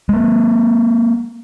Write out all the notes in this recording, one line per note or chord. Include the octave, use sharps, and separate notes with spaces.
G#3 A#3